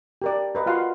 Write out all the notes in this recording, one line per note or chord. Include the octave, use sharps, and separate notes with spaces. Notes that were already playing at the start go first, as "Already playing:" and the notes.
G4 A#4 D5
A#4 B4 D#5
F4 F#4 F5 F#5 C6